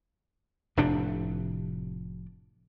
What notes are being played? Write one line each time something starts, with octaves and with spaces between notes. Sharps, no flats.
F1 A2 C3 D4